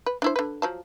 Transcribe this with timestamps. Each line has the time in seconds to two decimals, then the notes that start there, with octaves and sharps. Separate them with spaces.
0.06 B4
0.22 D4 E4 C5
0.36 D3 B4
0.62 F3 F#3 A5